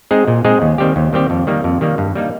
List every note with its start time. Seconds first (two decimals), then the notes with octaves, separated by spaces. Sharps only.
0.11 G#3 C4 D#4 G#4
0.28 A#2
0.45 G#3 C4 D#4 G#4
0.62 D#2
0.78 D#3 G3 C4 G4
0.96 D#2
1.13 D#3 G3 C4 G4
1.30 F2
1.47 D#3 G3 A#3
1.64 F2
1.81 D#3 G3 A#3
1.98 G2
2.15 G3 A#3 D#4